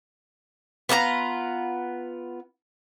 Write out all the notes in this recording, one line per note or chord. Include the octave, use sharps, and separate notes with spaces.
B3 F4 G4 A#5